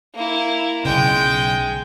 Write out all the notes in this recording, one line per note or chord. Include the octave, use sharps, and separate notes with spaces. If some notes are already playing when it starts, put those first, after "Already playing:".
A#3 E4
B1 C#3 G#3 G5